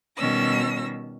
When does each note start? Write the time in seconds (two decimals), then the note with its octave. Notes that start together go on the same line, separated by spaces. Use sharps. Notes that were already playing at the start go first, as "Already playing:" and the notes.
0.17 B2 D#3 G3 C#4 E6 A#6